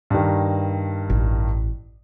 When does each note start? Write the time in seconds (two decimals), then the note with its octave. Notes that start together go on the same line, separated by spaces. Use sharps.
0.10 G2 D#3
1.10 A1